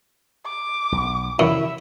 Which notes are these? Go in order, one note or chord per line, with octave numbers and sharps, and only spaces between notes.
D6
B1
F#2 C3 D#3 E4 E5